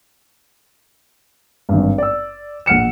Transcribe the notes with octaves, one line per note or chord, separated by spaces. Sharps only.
G#1 G2
D5 E6
A#1 F#5 F6 C#7 E7